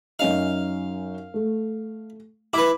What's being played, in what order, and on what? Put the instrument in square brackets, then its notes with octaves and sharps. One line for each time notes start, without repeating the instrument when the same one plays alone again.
[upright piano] F#2 C#4 D#4 [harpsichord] F5
[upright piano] A3
[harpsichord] E4 B4 [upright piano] D6